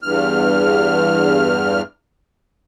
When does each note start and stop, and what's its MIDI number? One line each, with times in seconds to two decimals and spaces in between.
0.02 1.82 40
0.02 1.82 43
0.02 1.82 89